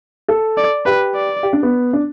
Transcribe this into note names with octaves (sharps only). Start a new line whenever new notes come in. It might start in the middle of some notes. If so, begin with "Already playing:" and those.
A4
D5
G4 B4
D5
G4
D4
B3
D4